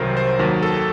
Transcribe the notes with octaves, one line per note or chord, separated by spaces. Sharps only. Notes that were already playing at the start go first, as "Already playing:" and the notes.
Already playing: C2 C3 D#3 F#3 A#4 C5
C5
D#2 D#3 F#3 A#4
A4